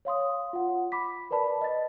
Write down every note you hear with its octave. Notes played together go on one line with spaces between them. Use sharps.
C#5 F5 C6 D#6
F4 F#5
B5 D6 B6
A#4 B4 D5 A5 B5
D#5 A6